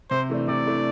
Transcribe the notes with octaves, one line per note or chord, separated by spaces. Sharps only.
C3 C5
E3 A3 D4
C3 D5
E3 A3 D4